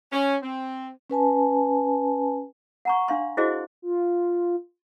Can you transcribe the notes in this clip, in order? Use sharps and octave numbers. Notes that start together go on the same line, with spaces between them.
C#4
C4
C#4 B4 G#5 A5
F#5 A#5 C#6
D4 F5 C6
E4 F#4 G#4 C5 D#5
F4